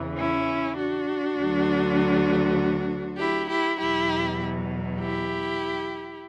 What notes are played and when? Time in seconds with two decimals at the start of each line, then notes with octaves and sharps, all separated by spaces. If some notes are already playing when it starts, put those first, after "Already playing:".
Already playing: E2 C#3 E3
0.17 C#4 E4
0.77 D4 F#4
1.38 D2 D3 F#3
3.18 E4 G4
3.49 E4 G4
3.79 E2 B2 F#3 E4 G4
5.00 E4 G4